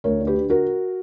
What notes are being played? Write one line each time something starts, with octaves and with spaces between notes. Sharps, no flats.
D2 A#4 C#5
D3
G4 B4
D3
F#4 A#4